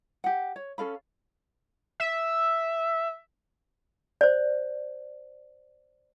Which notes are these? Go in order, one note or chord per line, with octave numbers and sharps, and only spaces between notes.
G4 F#5
C#5
C#4 A4 F5 B5
E5
C5 D5